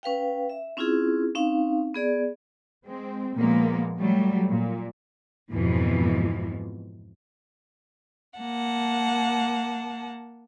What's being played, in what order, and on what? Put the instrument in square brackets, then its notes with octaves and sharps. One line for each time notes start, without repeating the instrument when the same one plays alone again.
[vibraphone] C#4 B4 F5 G5
E5
C4 C#4 E4 F4 G#4
C4 C#4 D#4 F5
B3 G#4 D5
[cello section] G#3 C4
A#2 F3 G#3 A#3 B3
F#3 G3 A3
A#2
[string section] F2 G#2 B2 E3 F3
[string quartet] A#3 F#5 A5